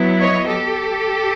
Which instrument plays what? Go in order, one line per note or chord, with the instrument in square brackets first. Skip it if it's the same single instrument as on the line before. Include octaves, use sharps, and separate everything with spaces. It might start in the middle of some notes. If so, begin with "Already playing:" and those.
Already playing: [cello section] F#3 B3 E4
C#5 D#5
G4 A4